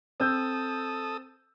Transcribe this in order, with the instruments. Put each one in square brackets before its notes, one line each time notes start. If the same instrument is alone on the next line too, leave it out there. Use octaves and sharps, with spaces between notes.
[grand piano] C4 E6 G6 [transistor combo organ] A4 D#6